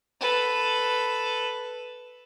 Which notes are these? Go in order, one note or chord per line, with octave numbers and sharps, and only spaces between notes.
A4 B4